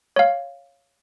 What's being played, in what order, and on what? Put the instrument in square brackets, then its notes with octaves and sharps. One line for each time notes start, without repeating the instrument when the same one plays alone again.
[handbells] C#5 F5